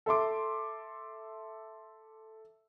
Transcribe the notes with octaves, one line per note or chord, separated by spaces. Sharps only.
A4 E5 C6 D6